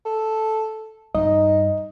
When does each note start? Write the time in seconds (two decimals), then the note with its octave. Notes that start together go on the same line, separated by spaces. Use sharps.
0.05 A4
1.15 G2 D#4 D#5